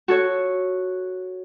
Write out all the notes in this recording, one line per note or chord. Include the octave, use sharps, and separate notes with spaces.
F#4 A4 C#5